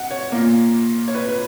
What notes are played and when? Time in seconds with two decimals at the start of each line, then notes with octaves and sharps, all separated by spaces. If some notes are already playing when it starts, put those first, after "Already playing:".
Already playing: F#5
0.11 C#5
0.32 A#2 A#3
1.08 C#5
1.15 B4
1.29 B4